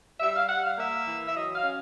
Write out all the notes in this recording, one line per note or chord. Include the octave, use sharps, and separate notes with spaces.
G3 E5
F5
G3 F#5
F5
A#3 E5
E3
E5
F#3 D#5
F5
C#4